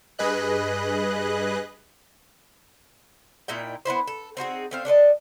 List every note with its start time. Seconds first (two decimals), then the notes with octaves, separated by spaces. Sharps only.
0.19 G2 G#4 B4 D#5 F#6
3.48 A#2 D#4 E4 G5
3.85 B3 C4 E4 C5
4.07 A4
4.37 C4 D#4 F#4 G#4
4.71 A3 C4 F5
4.85 D4 A4 C5 D#5